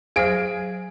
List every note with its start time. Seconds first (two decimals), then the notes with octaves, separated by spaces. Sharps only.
0.16 F#3 G#4 C5 F5 D7